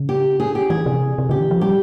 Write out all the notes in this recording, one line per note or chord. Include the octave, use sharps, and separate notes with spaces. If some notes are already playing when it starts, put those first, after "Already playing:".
Already playing: C#3
G4
G#4
G4
E3 G#4
C3
C3
C#3 G4
E3
F3
G3 G4